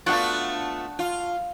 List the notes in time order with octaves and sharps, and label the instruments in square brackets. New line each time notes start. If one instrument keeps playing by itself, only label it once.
[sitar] A3 B3 F4 [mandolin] D4 F#4
[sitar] F4